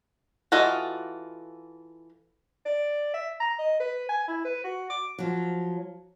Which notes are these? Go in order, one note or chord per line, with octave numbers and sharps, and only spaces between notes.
E3 F4 F#4 A4 D#5
D5
E5
A#5
D#5
B4
G#5
E4
B4
F#4
D6
F3 F#3